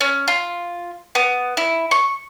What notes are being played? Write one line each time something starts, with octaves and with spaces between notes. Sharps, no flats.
C#4
F4
B3
E4
C#6